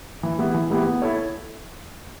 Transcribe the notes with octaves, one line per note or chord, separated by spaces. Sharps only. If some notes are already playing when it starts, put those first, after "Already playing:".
E3
G#3 B3 E4 G4
E3
G#3 B3 E4 G4
B3
E4 A4 C#5